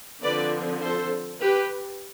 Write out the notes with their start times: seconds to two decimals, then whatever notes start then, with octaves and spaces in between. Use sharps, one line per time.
0.23 D3 F3 C4 B4 D5
0.82 A4 C5
1.41 G4 B4